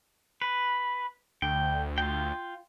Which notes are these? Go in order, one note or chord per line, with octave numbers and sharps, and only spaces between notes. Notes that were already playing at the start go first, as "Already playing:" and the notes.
B4
D2 G5
F4 G5